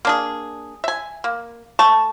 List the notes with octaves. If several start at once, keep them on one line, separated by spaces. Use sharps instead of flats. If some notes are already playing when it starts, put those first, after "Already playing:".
A#3 D4 G#4
E5 G#5
A#3
A3 A5 C#6